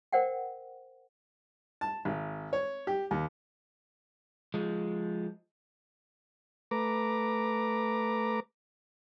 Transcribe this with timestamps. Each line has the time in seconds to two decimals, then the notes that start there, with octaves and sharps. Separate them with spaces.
0.13 A#4 C5 D5 F#5 G5
1.81 A5
2.05 G#1
2.53 C#5
2.87 G4
3.11 D#2
4.54 F3 G#3
6.71 A3 B4 A#5 D6